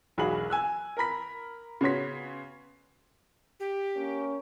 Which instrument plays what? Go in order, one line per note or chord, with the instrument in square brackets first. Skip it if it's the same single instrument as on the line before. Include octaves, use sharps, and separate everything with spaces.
[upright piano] E1 B1 F#4 G#4 B5 F#7
G#5 E6 F#6
A#4 A#5 B5 B6
C#3 B3 F#4 C#5 C6 B6
[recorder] G4
[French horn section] A#3 C#4